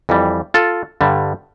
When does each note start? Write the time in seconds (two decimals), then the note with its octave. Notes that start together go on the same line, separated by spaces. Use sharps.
0.09 F2 E3 G3
0.54 F4 A4
1.01 G2 D3 G3